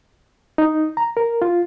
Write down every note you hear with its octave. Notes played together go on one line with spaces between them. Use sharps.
D#4
A#5
A#4
F4